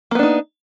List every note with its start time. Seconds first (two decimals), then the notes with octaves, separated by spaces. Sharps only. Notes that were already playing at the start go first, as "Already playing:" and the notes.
0.11 A#3
0.15 B3
0.19 D4
0.23 D#4